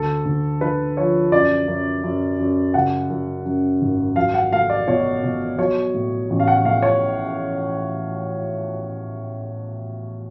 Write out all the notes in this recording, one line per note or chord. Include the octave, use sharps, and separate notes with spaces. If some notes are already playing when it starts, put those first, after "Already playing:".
Already playing: D2 A4
D2
D3 B4
F3 C#5
F#2 D5
F#2
F#2
F#2
C#3 F#5
F#2
F#2
G#1
F#3 F5
F#5
A3 F5
D5
B2 C#5
B2
F#3 C#5
A2
A1
F5
F#5
A2 F5
C#5